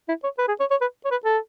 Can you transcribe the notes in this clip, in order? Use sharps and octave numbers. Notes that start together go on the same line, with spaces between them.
E4
C#5
B4
G#4
C#5
C#5
B4
C#5
B4
A4